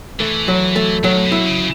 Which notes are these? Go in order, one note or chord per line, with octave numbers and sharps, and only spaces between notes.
E3 A3
F#3
A3
D#3 F#3
A2
B2
E4
C#3